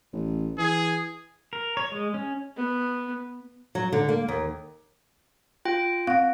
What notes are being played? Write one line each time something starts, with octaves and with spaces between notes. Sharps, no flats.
A1
E3 G#4
A#4
C#5
G#3
C#4
B3
F#3
D3
A#3
D#2
F4 G5
C4 F5 F#5